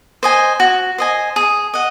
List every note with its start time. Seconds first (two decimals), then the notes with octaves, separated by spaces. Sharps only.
0.23 C5 D#5 G#5
0.60 F#4
0.98 C5 D#5 G#5
1.36 G#4
1.74 D#5 F#5